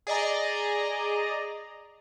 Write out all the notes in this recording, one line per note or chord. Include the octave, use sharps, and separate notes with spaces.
G#4 D5 D#5 A#5